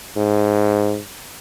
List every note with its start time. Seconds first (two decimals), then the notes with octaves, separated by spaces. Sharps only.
0.16 G#2